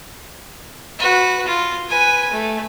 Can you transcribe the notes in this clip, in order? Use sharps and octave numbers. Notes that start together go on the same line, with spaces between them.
F#4 B4
F4
B4 G#5
A3